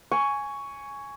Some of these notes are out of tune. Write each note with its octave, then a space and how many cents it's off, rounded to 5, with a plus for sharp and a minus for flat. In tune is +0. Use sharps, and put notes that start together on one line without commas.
G#5 +0 C#6 +10